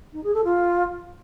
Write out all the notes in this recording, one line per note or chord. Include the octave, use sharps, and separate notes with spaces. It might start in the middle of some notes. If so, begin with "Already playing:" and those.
D#4
G#4
A4
F4